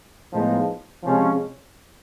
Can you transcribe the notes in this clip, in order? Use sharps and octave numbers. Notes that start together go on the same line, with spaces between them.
A2 F3 G#3 B3 D#4
C3 F3 G#3 C#4